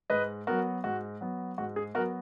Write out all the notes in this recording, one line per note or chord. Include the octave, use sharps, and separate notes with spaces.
G#2 B4 D#5
F#3 B3 F#4 A#4
G#2 F#4
F#3 B3
G#2 F#4
G#4
F#3 B3 F#4 A#4